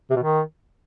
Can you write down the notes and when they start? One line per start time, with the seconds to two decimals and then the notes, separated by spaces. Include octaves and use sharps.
0.10 C3
0.16 B2
0.22 D#3